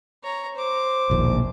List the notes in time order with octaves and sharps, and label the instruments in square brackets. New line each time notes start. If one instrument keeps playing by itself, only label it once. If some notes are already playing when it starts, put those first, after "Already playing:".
[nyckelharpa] C#5 A#5
C5 D6
[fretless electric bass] E1 A#1 D#2